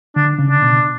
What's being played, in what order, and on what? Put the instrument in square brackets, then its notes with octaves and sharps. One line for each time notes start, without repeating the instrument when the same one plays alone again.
[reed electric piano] D3 [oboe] D4
[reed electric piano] C#3
[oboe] D4
[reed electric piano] B2